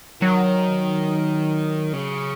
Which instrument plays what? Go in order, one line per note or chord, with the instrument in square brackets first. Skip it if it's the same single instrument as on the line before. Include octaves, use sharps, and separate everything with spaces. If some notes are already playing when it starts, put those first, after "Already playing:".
[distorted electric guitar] D#3 [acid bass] F#3
[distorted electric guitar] C#3